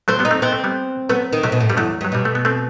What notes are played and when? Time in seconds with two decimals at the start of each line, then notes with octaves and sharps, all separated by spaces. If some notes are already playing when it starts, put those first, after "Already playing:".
0.08 F#3 A3 C4
0.19 G3 B3
0.25 D#4
0.31 A3 C4
0.42 B3 C4
0.52 A3
0.64 G3 B3
1.09 F#3 A3 B3
1.33 D#3
1.43 C3 F#3 A3
1.52 B2
1.60 A2
1.69 G2 G3
1.77 E2 F#3 A3
2.01 G2 F#3
2.12 B2 G3
2.25 A3
2.35 B3
2.45 A3 C4